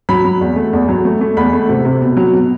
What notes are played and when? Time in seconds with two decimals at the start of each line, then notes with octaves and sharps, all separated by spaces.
0.09 F#3 B5
0.24 F#3
0.41 E2
0.56 A3
0.73 E2
0.89 F#3
1.05 A3
1.21 A3
1.37 E2 B5
1.53 A3
1.69 C3
1.85 C3
2.01 B2
2.17 F#3
2.33 B2